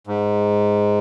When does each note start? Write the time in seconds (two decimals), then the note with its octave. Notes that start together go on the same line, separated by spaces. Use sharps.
0.07 G#2